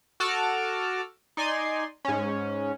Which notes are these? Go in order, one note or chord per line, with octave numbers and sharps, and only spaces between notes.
F#4 A4 A5 D6 E6 F6
D#4 D5 G#5 C6
G#2 C#4